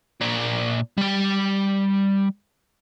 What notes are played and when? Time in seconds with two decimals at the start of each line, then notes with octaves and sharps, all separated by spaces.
0.21 A#2 D4
0.98 G3 G5